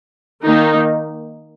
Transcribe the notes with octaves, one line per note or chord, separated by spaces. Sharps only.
D#3 A#3 D#4